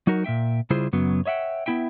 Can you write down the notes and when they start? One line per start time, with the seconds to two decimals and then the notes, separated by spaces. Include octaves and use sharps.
0.07 F#3 D#4 F#4 A#4
0.24 A#2 C4 E5 G5
0.70 C#3 G3 E4 F4 G#4 C5
0.93 F#2 C#3 F#3 B3
1.25 C#5 D#5 E5 F#5 G5
1.66 B3 C4 E4 E5 G5